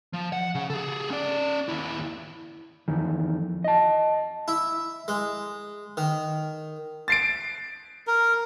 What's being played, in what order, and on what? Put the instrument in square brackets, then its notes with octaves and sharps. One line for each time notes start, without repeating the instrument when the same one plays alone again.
[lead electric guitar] F3
F#5
C#3
G#4 A4
C#4 D5
D#2 E4
[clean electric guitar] F2 D#3 E3
D#5 A5
[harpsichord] E4
G#3
D#3
[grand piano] A6 C7 D7
[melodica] A#4